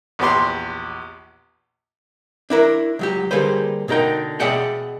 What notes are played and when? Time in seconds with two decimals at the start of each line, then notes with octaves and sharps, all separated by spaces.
0.19 A#1 E2 B3 G4 B4 C6
2.50 D4 E4 A#4
2.99 C#2 F#3 G4
3.31 D3 G3 A#3 G#4 B4 C5
3.88 B2 D3 D#4 A#4 G5
4.40 B2 G#4 D5 E5 F#5 G5